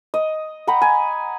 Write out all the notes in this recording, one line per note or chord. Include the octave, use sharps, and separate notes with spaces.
D#5
F#5 G5 A#5 B5
G#5